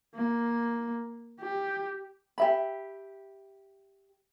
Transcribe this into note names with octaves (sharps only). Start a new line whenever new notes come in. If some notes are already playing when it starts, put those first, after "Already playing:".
A#3
G4
G4 E5 B5